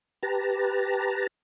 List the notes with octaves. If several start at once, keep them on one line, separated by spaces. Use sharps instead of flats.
G4 B4 A5 A#5